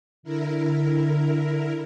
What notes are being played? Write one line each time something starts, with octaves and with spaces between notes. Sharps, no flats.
D3 E4 A#4